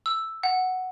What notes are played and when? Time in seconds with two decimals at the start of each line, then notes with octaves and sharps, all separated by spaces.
0.06 E6
0.43 F#5